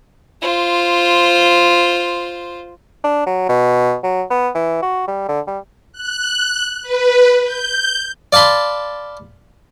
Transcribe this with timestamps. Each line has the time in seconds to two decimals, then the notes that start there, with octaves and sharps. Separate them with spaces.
0.42 F4 C5
3.04 D4
3.26 F#3
3.49 B2
4.03 F#3
4.30 B3
4.54 E3
4.82 F#4
5.07 G3
5.28 D3
5.47 G3
5.92 F#6
6.82 B4
7.44 G6
8.33 D5 F5 A5 B5 C6